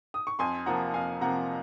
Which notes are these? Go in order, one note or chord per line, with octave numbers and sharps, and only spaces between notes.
D#6
C#6
F2 G#5 C6
C3 F3 A#3 F#5 A#5
F2 F5 G#5
C3 F3 A#3 F#5 A#5